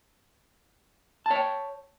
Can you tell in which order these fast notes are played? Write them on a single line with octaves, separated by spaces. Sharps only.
A5 C#5 G5